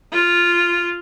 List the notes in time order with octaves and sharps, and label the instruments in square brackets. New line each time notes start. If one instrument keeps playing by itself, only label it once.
[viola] F4